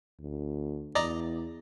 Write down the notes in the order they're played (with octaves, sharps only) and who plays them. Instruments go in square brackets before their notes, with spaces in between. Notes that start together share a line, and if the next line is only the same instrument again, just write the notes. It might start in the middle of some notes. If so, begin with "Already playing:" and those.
[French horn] D2
[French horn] E2 [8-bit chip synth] D5 D#5 A#5